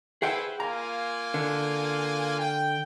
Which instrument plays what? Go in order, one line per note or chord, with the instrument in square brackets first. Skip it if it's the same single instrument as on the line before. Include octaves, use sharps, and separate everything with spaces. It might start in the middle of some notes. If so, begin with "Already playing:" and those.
[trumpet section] E4 B4 C5 [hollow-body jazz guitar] G#4 F#5 G5
[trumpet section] A#3 F4 G#5 [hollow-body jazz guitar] A#5
[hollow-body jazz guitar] D3
[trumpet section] G5